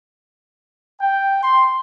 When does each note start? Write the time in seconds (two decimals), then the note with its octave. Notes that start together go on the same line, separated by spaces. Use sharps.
1.00 G5
1.43 C6